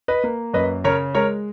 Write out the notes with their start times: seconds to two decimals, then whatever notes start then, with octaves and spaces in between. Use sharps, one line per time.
0.08 B4 D#5
0.24 A#3
0.53 F#2 B4 D#5
0.84 C#3 A#4 C#5
1.15 G#3 A#4 C#5